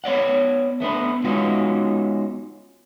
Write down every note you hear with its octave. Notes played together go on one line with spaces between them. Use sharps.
B3 C#5 D5 F#5
A3 B3 D4 B4
G#3 B3 C#4 D#4 F4 F#4